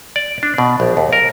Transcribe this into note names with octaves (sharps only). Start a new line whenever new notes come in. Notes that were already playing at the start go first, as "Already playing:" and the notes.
D5
D4
B2
A#1
D#2
A#4